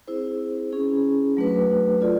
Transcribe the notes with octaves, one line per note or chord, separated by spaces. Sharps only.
C4 E4 G#4 C5
C#4 E4 G#4
F#3 A3 D4 F#4 B4
F4 A4 D5